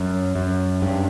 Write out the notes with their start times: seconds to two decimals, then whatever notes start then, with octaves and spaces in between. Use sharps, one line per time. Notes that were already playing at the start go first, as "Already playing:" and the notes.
Already playing: F#2
0.36 F#2
0.82 G2